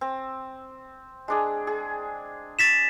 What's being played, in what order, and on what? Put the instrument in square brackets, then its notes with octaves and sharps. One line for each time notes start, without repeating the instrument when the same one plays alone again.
[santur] C4
G#3 D4 G#4
G#4
[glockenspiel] A6 B6 E7